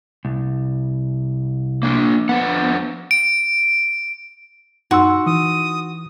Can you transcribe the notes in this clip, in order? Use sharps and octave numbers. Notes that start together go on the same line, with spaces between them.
C2
A#3 D4
F2 B3 D4 F#5
D7
F#2 D#4 F#4 C6 E6
E3 D#6